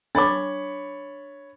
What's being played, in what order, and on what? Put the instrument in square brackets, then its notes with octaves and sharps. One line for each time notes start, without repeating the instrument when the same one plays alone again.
[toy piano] D4 D6 [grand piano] C#5 B5 A6